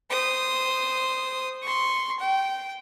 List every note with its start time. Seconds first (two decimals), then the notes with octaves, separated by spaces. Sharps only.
0.10 C5 D#6
1.62 C6 C#6
2.19 G5